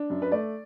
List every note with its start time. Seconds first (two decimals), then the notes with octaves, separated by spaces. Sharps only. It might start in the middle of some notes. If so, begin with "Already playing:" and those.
Already playing: D4
0.10 F#2
0.22 B4
0.31 A3 D5